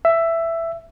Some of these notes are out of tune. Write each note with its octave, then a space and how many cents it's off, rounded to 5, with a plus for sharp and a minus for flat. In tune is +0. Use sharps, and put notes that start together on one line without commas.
E5 +10